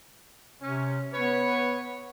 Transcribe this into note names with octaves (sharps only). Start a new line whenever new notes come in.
C3 C#4
B3 B4 C#5